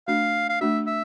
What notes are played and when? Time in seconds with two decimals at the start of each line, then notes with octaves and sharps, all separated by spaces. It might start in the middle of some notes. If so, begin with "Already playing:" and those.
0.08 A3 D4 F#4 F5
0.50 F5
0.61 A3 D4 F#4 E5
0.87 E5